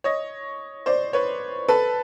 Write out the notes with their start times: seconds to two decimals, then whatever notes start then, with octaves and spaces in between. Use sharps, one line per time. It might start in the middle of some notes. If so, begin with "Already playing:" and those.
0.04 C#5 D#5
0.86 C5 D5
1.13 B4 C#5
1.68 A4 B4